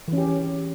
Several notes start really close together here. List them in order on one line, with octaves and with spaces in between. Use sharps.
E3 C#4 G4